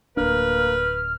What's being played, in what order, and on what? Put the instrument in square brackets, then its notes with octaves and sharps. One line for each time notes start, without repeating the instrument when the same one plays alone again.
[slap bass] D1 D4 [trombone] A#3 [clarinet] B4 [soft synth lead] F6